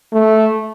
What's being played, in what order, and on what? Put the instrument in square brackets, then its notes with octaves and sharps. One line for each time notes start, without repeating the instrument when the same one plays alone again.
[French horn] A3